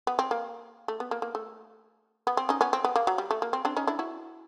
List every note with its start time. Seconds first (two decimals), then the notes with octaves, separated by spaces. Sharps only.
0.07 B3
0.19 C4
0.31 A#3
0.88 A3
1.00 B3
1.11 A#3
1.22 A#3
1.35 A3
2.27 B3
2.37 C4
2.49 C#4 D#4
2.61 B3 C#4
2.73 C4
2.84 B3
2.96 A#3
3.07 F#3
3.18 G3
3.31 A3
3.42 A#3
3.53 C4
3.65 C4 D4
3.76 C#4 D#4
3.87 D4 E4
3.99 E4 F#4